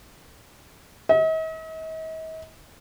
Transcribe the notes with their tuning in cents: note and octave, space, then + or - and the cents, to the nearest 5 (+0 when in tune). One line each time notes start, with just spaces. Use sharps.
D#5 +45